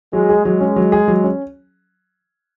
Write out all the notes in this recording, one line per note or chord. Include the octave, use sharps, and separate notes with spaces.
F#3 G#3
G#4
F#3 G#3
C#4
F#3
G#4
F#3
C#4